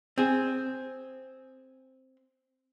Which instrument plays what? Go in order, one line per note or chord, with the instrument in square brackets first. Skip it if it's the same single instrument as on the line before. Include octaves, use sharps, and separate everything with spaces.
[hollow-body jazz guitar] C4 G#4